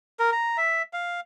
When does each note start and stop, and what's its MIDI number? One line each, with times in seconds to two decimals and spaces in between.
0.19 0.30 70
0.32 0.57 82
0.57 0.82 76
0.93 1.20 77